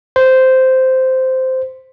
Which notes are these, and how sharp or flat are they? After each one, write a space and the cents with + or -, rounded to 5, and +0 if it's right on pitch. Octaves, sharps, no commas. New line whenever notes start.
C5 -10